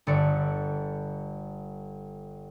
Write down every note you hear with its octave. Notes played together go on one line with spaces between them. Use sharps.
G1 A4 D5 C#7